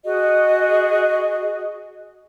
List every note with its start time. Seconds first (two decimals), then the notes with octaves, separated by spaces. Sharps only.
0.05 F#4 G#4 D#5